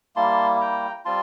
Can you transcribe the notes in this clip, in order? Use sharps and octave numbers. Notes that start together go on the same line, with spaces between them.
G3 A#3 E4 A5 C6
G5 A#5
G3 C4 F4 A5 C6